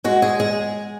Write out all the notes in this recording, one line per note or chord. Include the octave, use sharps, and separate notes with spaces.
G#3 F#4
G#4
G#3 G#4